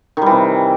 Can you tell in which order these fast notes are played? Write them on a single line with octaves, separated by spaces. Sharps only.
D#3 G3 E3 C3